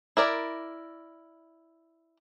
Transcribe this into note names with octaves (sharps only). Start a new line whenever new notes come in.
E4 A#4 D5